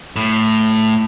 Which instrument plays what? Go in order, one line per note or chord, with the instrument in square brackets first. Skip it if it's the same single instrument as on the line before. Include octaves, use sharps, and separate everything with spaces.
[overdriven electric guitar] A2